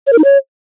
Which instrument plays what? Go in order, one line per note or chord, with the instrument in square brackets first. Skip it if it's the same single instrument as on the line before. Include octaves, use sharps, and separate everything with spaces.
[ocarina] C#5
A#4
D#4
C#5